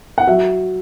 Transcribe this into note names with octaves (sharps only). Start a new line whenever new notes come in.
F#5
F#3 E5